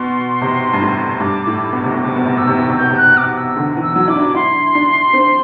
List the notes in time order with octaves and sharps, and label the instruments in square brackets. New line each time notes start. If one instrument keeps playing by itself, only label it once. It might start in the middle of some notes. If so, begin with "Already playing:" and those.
Already playing: [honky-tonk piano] B2 [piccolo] C6
[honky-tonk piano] C3
G2
A2
[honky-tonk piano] G2 [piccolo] D6
[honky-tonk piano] A2
[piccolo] D6
[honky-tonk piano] B2
C3
B2
[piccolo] D6
[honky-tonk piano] C3
B2
C3
[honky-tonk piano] B2 [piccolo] E6
[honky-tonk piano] C3
B2
C3
[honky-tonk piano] B2 [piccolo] G6
[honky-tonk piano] C3
[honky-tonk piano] B2 [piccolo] F#6
[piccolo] D6
E6
[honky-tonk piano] D3
E3
[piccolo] E6
[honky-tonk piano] F#3
[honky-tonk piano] E4 [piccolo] D6
[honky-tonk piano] D4
[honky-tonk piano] E4 [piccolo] C6
[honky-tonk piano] D4
C4